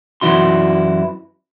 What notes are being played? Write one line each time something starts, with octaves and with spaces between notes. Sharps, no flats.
F#2 E3 E4 F#4 C6